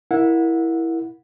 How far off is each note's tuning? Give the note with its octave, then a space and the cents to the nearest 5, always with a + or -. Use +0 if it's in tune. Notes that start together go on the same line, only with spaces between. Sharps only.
E4 +0 A#4 +5 F#5 -30